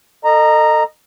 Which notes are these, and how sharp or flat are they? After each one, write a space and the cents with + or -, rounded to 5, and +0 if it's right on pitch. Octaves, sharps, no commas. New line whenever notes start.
A4 +25 D#5 -25 A#5 +0